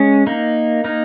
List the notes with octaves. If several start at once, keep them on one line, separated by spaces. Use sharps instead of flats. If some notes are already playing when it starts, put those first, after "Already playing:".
Already playing: G#3 C#4
A#3 D#4
A#3 D#4